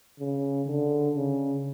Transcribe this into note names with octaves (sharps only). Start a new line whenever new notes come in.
C#3
D3
C#3